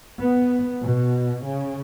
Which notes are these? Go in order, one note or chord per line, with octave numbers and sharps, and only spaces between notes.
B3
B2
C#3